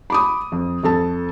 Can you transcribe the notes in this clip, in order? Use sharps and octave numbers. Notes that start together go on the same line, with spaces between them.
B5 D6 D#6
F2
F2 A4 A5